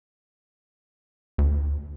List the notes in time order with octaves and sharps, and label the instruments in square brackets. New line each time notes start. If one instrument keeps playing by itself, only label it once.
[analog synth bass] D2